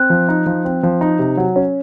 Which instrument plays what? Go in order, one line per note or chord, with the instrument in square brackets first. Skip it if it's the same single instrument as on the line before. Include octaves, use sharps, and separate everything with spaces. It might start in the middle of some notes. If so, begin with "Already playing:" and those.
Already playing: [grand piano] C4 [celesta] F#6
[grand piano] F3
D#4
F3
C4
F3
D#4
C3
F#3
C#4